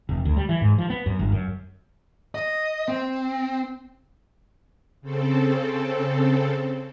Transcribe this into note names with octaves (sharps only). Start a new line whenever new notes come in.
F1
D2
G3
E3
G#2
F3
B3
F#2
G1
F#2
D#5
C4
C#3 C4 A4